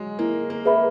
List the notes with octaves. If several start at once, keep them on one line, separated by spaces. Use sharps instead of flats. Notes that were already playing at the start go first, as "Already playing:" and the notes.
Already playing: F#3 G#3
A#3 E4
A#3
G#4 B4 E5 B5